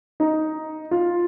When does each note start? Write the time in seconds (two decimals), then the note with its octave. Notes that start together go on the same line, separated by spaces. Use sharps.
0.20 D#4
0.91 F4